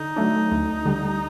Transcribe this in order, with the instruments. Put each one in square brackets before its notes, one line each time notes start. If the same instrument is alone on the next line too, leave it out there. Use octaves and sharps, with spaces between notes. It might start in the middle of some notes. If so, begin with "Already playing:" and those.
Already playing: [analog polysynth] D3 [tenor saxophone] D#4
[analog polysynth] F#3 A3 D4
D2
D3 G3